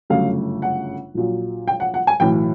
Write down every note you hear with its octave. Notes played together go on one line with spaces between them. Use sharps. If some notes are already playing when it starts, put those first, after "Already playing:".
G1 F#2 C#3 F#3 A3 F5
F#5
A#1 A#2 F#3
G5
F#5
F#5
G#5
B1 A2 E3 G5